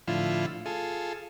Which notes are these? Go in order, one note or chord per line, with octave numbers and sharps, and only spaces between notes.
A2 D3 F3 E4 F4
F4 G#4 A4